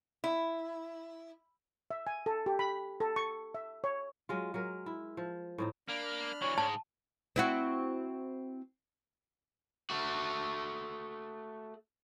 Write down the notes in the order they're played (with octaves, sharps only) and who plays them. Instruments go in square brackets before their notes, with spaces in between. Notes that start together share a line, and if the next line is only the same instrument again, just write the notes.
[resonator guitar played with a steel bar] E4
[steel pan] E5
G#5
A4
G4
B5
A4
C#6
E5
C#5
[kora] F#3 G#3 F4
F#3 G#3 A#4
E4
F3
A2 C4 D#4
[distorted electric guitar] A#3 [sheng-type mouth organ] D4 B5 F6
[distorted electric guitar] E3 F#3 [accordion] C#5 C#6
[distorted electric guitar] G#2 G#3 [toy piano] A5
[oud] C4 E4 F#4
[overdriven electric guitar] A3 F#4